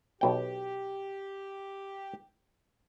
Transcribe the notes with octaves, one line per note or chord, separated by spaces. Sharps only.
B1 B2 G4 G5